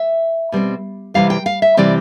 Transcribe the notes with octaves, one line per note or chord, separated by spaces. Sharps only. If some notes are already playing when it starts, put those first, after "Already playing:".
Already playing: E5
B2 G3 C4
C3 E3 G3 C4 F5
G5
F5
E5
C3 E3 G3 C4 D5